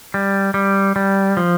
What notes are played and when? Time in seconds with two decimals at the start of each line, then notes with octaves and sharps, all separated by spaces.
0.14 G3
0.54 G3
0.96 G3
1.37 F3